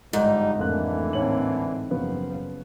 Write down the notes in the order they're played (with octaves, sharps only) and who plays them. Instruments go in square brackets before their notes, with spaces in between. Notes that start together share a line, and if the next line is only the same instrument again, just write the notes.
[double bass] G1 [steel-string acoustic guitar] G#2 [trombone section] F3 G3 D#4
[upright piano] F1 A#3 F#6 [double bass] A2 A3 [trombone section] D3 E3 D4
[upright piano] D#2 C#5 F#7 [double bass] A2 C4
[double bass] F#1 F3 [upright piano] C#3 F#3 B3